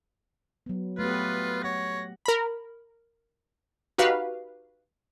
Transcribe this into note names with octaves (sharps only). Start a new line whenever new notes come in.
F#3 B3
A3 B3 F4 G4 B4
C#5 F#5 A#6
A#4 B5
D#4 F#4 G4 B4 F5